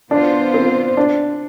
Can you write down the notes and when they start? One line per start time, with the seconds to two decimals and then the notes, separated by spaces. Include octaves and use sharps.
0.10 E3 B3 D4 F4 C5
0.54 C4
0.97 D4